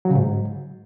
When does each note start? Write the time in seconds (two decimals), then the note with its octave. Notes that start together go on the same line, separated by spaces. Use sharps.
0.05 F#3
0.10 C#3
0.15 G#2